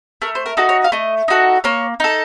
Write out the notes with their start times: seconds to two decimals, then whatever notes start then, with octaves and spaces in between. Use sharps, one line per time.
0.22 A3 A#4
0.35 C5
0.46 A#4
0.57 D#4 F#4 A4
0.69 C#5
0.84 F5
0.92 A3 D#5
1.28 D#4 F#4 A4
1.64 A#3 C#5
2.00 D#4 A4